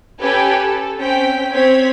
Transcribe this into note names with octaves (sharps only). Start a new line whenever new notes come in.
C#4 G4 A4 B4 G5 G#5
A4
C4 C#4 G5 B6
C4 C#5 G#6 B6